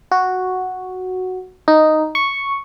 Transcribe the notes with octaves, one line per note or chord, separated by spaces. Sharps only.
F#4
D#4
C#6